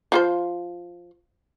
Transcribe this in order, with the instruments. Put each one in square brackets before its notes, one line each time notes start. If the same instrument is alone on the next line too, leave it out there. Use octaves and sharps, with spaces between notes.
[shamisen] F3 F4 C5